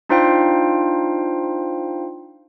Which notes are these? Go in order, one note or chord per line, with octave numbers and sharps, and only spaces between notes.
D4 D#4 F4 C5 F5 G5